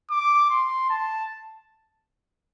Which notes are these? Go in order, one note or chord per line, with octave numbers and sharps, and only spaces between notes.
D6
C6
A5